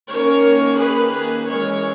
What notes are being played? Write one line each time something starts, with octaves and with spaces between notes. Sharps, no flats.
D#3 A#3 C#4 A#4 C#5
G#4 B4
G#4 B4
E3 G#3 C#4 A#4 C#5